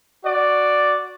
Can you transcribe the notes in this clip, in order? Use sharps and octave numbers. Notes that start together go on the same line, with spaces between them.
F#4 D5